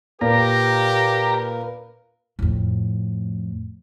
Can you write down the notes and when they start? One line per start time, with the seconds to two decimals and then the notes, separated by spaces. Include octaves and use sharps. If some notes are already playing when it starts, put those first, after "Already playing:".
0.21 A#2 G4 A#4 B4 A#5
2.39 F2 A2